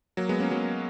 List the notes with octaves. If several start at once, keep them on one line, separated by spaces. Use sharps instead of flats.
F#3 A#3
G#3 B3
A#3 C#4
F#3 A#3